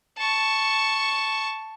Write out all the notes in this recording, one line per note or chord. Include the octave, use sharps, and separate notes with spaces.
A5 C#6